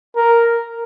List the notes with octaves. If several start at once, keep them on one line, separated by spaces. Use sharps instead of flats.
A#4